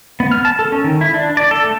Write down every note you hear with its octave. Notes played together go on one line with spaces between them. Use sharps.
B3
F6
A5
A4
C#4
D#3
E4
D4
D5
A4
A3